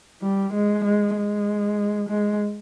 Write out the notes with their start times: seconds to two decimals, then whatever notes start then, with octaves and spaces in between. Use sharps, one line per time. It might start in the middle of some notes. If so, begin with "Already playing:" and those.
0.22 G3
0.53 G#3
0.84 G#3
1.16 G#3
2.09 G#3